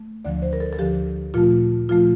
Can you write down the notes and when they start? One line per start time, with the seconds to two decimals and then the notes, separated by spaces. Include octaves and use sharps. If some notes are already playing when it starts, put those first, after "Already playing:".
Already playing: A3
0.25 D2 D3 F3 D5
0.42 C5
0.53 A#4
0.60 A4
0.73 A4
0.79 D2 D3 F3 G4
1.34 A#2 F3 A3 F4
1.89 A#2 F3 A3 F4